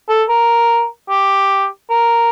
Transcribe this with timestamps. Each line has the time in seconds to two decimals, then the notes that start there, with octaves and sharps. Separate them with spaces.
0.09 A4
0.29 A#4
1.09 G4
1.90 A#4